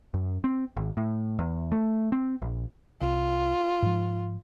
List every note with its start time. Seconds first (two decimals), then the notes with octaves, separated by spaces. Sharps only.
0.14 F#2
0.44 C4
0.77 G#1
0.97 A2
1.39 E2
1.72 A3
2.12 C4
2.42 A#1
3.01 C2 F4
3.82 G#2 F3